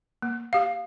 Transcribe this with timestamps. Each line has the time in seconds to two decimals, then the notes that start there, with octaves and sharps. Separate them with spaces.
0.22 A#3
0.53 G4 F5